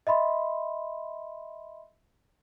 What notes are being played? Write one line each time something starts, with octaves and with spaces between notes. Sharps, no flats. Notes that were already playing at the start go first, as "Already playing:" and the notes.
D#5 E5 B5 C6